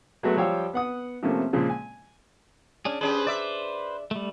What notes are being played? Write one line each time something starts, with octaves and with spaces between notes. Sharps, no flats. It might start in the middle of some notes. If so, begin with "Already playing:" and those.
F#3 G#3 A3 B3 F#4
F3 G3 C#5 F5 G5 E6
B3 F#5 D#6
C3 F3 A3 A#3 C#4
A#2 C#3 F3 G#3
G#5
C#4 D4 G#4
G3 C#4 G#4 B4 C5
D5 E5
G3 A3